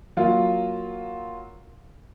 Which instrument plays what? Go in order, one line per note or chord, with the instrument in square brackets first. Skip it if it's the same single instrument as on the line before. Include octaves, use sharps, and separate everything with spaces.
[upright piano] F#3 A#3 F4